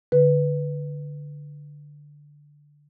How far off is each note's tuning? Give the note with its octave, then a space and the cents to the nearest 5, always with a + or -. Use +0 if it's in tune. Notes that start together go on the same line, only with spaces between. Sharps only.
D3 +0 B4 +0